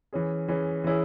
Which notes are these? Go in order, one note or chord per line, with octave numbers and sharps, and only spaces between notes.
E3 C#4 G#4
E3 C#4 G#4
E3 C#4 E4 G#4